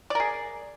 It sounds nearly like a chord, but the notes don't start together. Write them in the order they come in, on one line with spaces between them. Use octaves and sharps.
D5 A#4 G#4